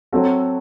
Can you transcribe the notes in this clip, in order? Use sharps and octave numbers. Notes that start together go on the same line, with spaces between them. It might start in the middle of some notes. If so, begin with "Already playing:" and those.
F#3 C4 F#4 A4